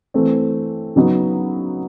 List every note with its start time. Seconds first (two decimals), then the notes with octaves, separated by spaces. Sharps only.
0.14 E3 A3 C4
0.96 C#3 F#3 B3 D#4